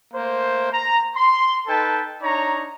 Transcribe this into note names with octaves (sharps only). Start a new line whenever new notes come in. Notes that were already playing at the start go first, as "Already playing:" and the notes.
A3 A#3 C5
A#5
C6
D#4 A4 B4 G5 A5
D4 D#4 C#5 A#5